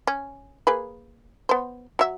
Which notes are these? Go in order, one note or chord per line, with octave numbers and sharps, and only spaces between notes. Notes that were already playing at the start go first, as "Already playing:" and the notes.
C#4
A#3 G#4 B4
B3 C5
F#3 E5